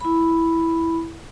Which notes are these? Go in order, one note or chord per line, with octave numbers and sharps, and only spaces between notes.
E4 B5